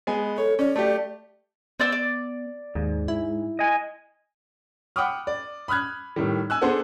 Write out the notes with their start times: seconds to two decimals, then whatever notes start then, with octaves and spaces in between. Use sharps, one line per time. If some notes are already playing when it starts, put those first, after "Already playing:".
0.07 G#3 B3 G#5
0.38 A4 C#5
0.59 C#4 D5
0.76 A3 G4
1.80 B3 C5 D5 E6
1.92 D5
2.75 D#2 G#2
3.08 E4
3.59 D#5 G#5
4.96 F#5 G5 B5 D6 D#6 F6
5.27 D5
5.68 B5 D#6 F6 F#6 G#6
6.16 A2 D#3 G3
6.50 G#5 E6 F#6
6.62 B3 D4 G#4 A4 C5